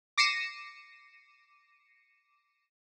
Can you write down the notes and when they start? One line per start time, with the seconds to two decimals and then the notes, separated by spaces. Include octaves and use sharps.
0.18 D6 A#6 C7 C#7 D#7 E7